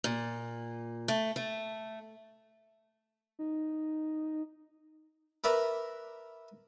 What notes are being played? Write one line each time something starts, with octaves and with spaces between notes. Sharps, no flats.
A#2
A3
A3
D#4
A#4 B4 D5 E5 A#5